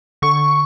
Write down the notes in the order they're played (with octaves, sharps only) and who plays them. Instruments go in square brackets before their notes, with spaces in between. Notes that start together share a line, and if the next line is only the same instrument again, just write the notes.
[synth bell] D3 C#6